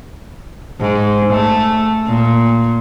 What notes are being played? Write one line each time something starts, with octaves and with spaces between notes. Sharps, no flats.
G#2
A3
A#2